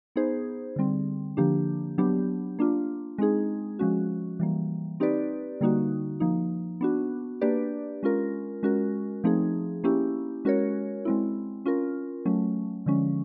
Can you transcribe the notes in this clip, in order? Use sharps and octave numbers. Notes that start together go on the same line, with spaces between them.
B3 D#4 G#4 C5
D3 G3 C4
D3 F3 A#3 D4 G4
F#3 B3 D4 G4
A#3 D4 F4
G#3 C4 D#4 G#4
F3 G#3 C#4 F#4
E3 G3 A#3
C4 D#4 G4 B4 D5
D3 G3 A#3 D#4 F#4
F3 A#3 D#4
B3 D4 F#4
A#3 D4 G4 B4 D5
G#3 C#4 F4 A#4
G#3 C#4 F#4 A#4
F3 A3 C4 D#4 G#4
A#3 C#4 E4 G4
G#3 C#4 F#4 A#4 C#5
G#3 C4 E4
C#4 F4 A#4
F#3 A3 C#4
D3 F3 G#3 C#4